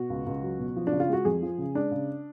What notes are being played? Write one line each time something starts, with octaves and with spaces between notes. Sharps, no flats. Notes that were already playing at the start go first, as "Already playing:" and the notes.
Already playing: B2 F#4
C#2
C#2
F#3
B2
F3
D4
C#3
F4
G#3 F#4
F2 G#4
F3
C#3
G#3 D4
C#3